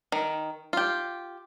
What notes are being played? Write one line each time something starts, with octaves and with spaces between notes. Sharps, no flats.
D#3
F4 G4